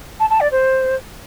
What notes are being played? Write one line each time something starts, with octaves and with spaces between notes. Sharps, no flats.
A5
A5
D5
C5